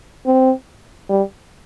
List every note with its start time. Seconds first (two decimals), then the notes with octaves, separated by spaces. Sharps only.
0.26 C4
1.09 G3